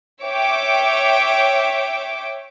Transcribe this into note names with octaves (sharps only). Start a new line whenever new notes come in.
C#5 E5 G5 D6